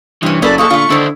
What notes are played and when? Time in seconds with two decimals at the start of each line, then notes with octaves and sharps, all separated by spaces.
0.23 G2 C3 E3 C#4
0.42 F#1 A#2 C#4 A4 B4 D5
0.58 F3 G#3 A4 C#6
0.70 D3 A3 F4
0.90 D3 D#3 D4 E4 C5